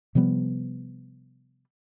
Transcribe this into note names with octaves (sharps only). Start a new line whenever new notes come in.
C3 F3 G3 B3